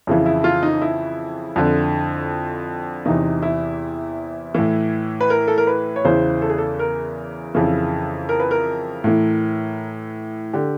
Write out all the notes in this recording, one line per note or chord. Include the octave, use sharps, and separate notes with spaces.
F2 C#3 E3 E4
E4
F4
D#4
E4
F2 D3
E2 C3 E3 D#4
E4
A2 E3
B4
A#4
A4
A#4
B4
C#5
E2 C#3 E3 C5
A4
G#4
A4
A#4
F2 C#3 E3
A#4
B4
A#4
A2 E3
D3 G4